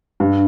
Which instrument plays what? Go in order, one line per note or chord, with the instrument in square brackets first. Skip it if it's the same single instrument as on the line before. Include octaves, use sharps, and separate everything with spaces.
[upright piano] G2